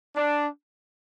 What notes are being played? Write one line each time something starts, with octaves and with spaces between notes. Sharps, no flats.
D4